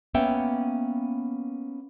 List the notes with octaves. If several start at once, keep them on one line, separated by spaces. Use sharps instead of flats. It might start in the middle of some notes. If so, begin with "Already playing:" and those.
A#3 B3 C#4 E5 F#5 G5